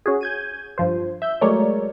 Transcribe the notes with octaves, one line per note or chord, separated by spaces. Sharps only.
C#4 F#4 G#4
G6 G#6 D#7
G2 F3 C5
E5 G6
F#3 G#3 A3 A#4 C#5 D5